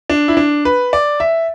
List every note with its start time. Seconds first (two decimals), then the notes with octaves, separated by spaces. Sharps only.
0.10 D4
0.28 E4
0.37 D4
0.65 B4
0.93 D5
1.20 E5